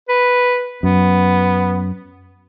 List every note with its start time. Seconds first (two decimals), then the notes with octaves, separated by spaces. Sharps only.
0.09 B4
0.83 F#2 B3